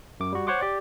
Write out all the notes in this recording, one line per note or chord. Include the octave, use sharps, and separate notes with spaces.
F#2 D6
G3 F#4
C5 C#5 F#5 C6 D6
G4 D5